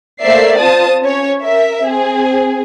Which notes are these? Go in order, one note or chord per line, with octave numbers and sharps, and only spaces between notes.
A3 A#3 C5 D5 E5 C7
C4 F4 C5 A5 D#6
C#4 C#5
A#4 E5
C4 G#4